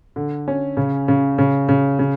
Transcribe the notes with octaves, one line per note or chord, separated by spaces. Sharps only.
D3
C#4
C#3
C#3
C#3
C#3
C#3